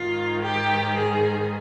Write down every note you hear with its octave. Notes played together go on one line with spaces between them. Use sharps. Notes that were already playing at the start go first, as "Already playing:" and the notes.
Already playing: G#2 D#3 F4
G4
G#4